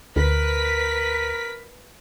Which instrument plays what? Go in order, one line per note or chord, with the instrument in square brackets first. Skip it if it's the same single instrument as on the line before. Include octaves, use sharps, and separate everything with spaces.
[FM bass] D2 [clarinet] A#4 [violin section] B4 B6